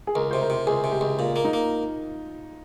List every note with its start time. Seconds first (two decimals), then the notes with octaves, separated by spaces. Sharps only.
0.07 G#4
0.15 C#2 A#4
0.31 C3 C5
0.41 A#4
0.50 C3
0.67 C#2 G#4
0.84 C3
0.92 G4
1.01 C#2
1.19 A#2 F4
1.36 A#3
1.45 D#4
1.53 A#3